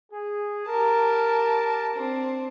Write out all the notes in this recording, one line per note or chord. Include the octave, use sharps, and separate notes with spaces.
G#4
G4 A#4 A5
C4 D4